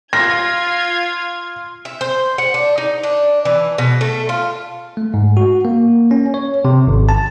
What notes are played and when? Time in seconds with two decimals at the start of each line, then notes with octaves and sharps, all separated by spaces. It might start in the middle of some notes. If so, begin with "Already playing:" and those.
0.13 F4 C6 F6 G#6 A#6
1.85 E5
2.01 C5
2.38 F#5
2.54 D4
2.78 D#4
3.03 D4
3.45 E3
3.78 B2
4.01 A3
4.29 F4
4.97 A3
5.14 G#2
5.37 F#4
5.65 A#3
6.11 C#4
6.34 C#5
6.65 C3
6.87 G#1
7.09 A5